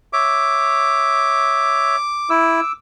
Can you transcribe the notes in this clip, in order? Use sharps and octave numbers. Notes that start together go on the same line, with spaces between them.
C#5 E5 D6
E4 D6 E6